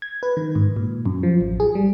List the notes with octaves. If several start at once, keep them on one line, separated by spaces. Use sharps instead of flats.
G#6
B4
D#3
G#2
A#2
F#2
F3
A1
G#4
G3